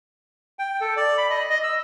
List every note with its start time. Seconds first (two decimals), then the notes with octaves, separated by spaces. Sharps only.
0.59 G5
0.81 A4
0.97 D5
1.18 B5
1.30 D#5
1.50 D#5
1.63 E6